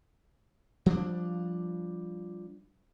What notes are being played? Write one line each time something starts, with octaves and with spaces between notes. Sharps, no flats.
F3 G3 B3 D4